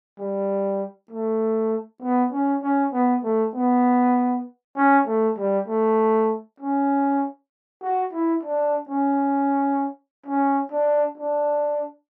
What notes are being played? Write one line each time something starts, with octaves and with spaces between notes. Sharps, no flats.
G3
A3
B3
C#4
C#4
B3
A3
B3
C#4
A3
G3
A3
C#4
F#4
E4
D4
C#4
C#4
D4
D4